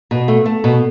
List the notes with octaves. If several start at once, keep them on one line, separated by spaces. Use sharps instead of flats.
B2
A3
A3
B2